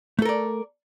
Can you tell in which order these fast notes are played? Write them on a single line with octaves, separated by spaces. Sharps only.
A3 A4 A#4 D5